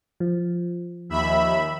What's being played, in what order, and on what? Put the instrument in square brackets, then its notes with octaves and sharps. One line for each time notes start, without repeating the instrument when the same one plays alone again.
[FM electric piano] F3
[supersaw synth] D#2 E5 B5